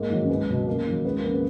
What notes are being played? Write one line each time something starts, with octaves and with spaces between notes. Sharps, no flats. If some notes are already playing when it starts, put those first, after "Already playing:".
Already playing: G#2 A#3
D#3 F#3
C#4
C#2 B3
B2 F#3
F#2 A#3
D#3 F#3
C#2 B3
A#3
C#3 F3 B3
B3